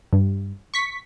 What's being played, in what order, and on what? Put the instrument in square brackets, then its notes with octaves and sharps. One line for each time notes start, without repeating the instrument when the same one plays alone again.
[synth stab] G2
C#6 B6